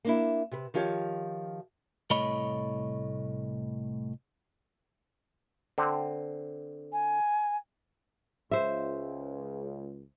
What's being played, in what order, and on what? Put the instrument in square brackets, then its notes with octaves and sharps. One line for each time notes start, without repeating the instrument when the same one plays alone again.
[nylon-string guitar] A#3 D4 E4
C3 B4
D#3 F3 F4 G4 C#5
[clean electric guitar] C2 A2 A3 C#5 D#5 B5
[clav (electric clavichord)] D3 C4
[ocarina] G#5
[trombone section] C#2 [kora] C5 E5